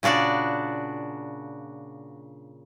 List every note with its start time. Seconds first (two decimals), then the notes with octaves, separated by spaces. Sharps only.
0.03 A#2 C#3 D4 F#4 D5